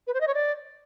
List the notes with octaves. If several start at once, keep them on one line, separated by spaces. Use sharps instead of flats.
B4
C5
D#5
C#5
D5